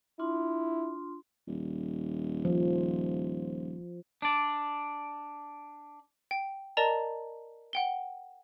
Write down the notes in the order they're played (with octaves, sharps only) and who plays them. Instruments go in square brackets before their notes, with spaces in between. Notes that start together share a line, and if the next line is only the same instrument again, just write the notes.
[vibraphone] D4 F4 C6 [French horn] E4
[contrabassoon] D#1
[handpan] F3
[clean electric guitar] D4 D5
[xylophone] G5
A#4 D5 D#5 A5 A#5
F#5 G5 G7